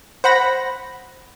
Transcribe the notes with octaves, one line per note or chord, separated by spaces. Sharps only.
C5 F#5 B5 A#6